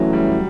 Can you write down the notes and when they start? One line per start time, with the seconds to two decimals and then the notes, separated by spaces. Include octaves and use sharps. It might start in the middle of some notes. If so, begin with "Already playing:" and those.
Already playing: E3 F#3 A3 C#4 E4
0.13 G3